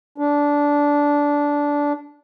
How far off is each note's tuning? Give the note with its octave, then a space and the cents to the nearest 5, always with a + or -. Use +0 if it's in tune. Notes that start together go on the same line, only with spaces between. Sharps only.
D4 -15